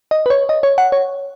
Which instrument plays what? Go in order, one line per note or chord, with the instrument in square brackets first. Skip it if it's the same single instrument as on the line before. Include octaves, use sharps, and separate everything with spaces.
[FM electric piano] D#5
B4
C#5
D#5
C#5
F#5
C#5